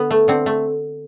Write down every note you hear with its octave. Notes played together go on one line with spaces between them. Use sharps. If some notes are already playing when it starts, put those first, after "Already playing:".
Already playing: D3 B3
A3
D3 C4
A3